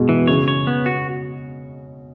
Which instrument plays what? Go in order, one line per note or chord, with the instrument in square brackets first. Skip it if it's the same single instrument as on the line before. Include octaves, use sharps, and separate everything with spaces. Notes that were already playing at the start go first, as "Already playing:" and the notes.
Already playing: [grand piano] B2 G#3
[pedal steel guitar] E3
[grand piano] C#3 [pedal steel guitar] C#5
[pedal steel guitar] C#5
B3
F#4